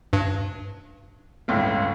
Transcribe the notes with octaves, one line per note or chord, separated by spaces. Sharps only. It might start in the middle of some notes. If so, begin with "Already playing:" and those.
G2
G1 C#2 A2